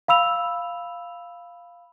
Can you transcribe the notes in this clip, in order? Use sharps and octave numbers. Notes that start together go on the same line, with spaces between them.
F5 B5 E6 F7